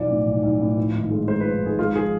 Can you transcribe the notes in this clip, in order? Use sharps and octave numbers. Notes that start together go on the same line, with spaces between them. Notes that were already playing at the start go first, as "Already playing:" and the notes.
Already playing: B1 E2 F3 D5
A2
B1
B1
A2
F3
G#1
G#3
G#3 C5
B4
F3
G#1 G#4
G#3 F4
F3 G#4